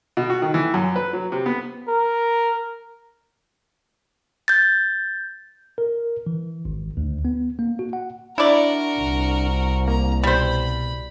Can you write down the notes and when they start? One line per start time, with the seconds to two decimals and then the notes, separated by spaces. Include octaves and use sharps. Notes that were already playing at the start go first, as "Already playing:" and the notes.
0.17 B2
0.30 F#4
0.42 D#3
0.54 E3
0.74 F#2
0.96 B4
1.13 F#3
1.32 C3
1.46 B3
1.88 A#4
4.48 G6 A6
5.78 A#4
6.26 E3
6.65 G#1
6.97 D2
7.25 B3
7.59 A#3
7.79 F#4
7.93 F#5
8.38 D4 E4 F#4 A#4 D5
8.99 C2
9.88 A#3 A#5
10.24 B2 G3 C5 B5